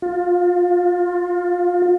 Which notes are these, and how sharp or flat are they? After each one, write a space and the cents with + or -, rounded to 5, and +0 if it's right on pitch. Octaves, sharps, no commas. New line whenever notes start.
F4 +25